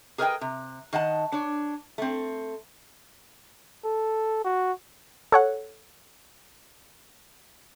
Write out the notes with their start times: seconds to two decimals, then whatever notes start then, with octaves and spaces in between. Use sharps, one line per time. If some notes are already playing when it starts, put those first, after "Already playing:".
0.18 G#4 A#4 B4 C#5 D#5 G5
0.41 C3
0.93 D#3 D#5 F#5 A5
1.32 D4 C#5
1.98 A3 C4
3.84 A4
4.45 F#4
5.32 A4 C#5 F#5